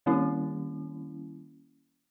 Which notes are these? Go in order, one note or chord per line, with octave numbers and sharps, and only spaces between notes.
D#3 G3 A#3 C#4 E4